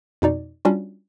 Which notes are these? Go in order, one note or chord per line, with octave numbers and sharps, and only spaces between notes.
F2 B2 D#4 D5
G3 C#4 D4 F4 F#4